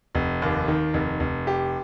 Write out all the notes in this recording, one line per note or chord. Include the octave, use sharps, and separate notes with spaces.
F1
D#2
D#3
F1
F1
G4